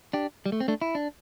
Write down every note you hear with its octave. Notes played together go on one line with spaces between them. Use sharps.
D4 G4
G3
A3
C4
A3 D4
E4
D4